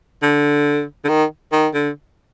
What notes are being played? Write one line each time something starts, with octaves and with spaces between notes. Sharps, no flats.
D3
D3
D#3
D#3
D3